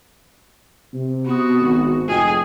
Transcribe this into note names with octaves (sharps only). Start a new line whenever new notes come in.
C3
B3 C4 F#4 D#6
G#1
F1 F4 G#4 D#5 G5